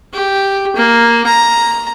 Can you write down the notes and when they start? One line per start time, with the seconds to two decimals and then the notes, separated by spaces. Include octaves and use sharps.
0.13 G4
0.76 A#3
1.26 A#5